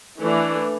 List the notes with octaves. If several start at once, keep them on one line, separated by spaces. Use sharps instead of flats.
E3 A3 D4